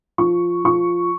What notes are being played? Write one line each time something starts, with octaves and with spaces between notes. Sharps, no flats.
F3 C#6
F3 C#6